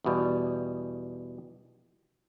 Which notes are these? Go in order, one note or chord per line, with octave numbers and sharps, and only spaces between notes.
E2 B2 G3